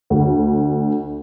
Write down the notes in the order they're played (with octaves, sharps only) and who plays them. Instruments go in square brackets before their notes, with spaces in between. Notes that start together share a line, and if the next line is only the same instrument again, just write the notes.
[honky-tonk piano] D2